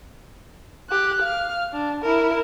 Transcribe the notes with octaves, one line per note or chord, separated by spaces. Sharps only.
G4 F#6
F5 F6
D4
E4 A#4